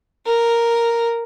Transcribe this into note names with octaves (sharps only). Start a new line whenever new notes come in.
A#4